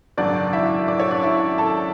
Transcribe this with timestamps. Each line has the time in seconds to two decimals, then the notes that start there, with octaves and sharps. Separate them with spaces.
0.17 G#1 F#2 C#3 F#3 D4 D5
0.53 E4 E5
0.88 D5
1.00 C#5
1.11 D4 D5
1.23 E4 E5
1.58 A4 A5